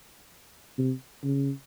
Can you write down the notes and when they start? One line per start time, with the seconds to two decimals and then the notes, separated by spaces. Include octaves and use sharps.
0.78 C3
1.23 C#3